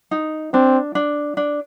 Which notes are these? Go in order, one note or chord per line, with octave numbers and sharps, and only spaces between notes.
D#4
C4 D4
D4
D4